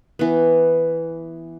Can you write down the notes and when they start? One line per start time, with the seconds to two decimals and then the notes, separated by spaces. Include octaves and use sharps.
0.19 E3 B3